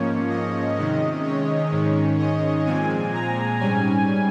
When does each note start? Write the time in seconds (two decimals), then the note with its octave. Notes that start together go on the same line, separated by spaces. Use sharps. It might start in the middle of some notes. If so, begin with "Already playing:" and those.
Already playing: G#2 F3 A#3 C#4 C#5
0.29 D#5
0.76 C3 D#3 G#3 C#4 D#5
1.24 C#5
1.72 G#2 D#3 G#3 C#4
2.19 D#5
2.66 A#2 F3 G#3 C4 G#5
3.14 A#5
3.60 G#2 G3 C#4 G#5